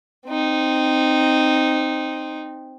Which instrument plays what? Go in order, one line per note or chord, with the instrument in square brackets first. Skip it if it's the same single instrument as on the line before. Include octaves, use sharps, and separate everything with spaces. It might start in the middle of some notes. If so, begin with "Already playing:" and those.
[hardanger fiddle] C4 D#4